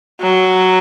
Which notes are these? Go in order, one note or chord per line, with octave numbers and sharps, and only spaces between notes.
F#3